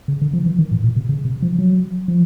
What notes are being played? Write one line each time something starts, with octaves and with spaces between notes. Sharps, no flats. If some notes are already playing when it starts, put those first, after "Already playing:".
C#3
D3
F3
E3
D#3
A2
A#2
C3
C#3
C3
F3
F#3
F3